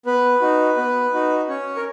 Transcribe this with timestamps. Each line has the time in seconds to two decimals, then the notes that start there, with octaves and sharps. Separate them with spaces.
0.06 B3 B4
0.41 D#4 F#4
0.77 B3
1.14 D#4 F#4
1.48 C#4 C#5
1.76 A#4